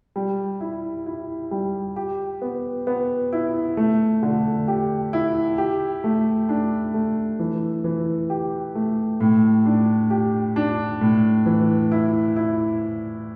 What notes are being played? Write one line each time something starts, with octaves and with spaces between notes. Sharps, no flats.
G3
E4
E4
G3
G4
B3
B3
E4
A3
D3
G4
E4
G4
A3
D4
A3
E3
E3
G4
A3
A2
D4
G4
D4
A2
E3
E4
E4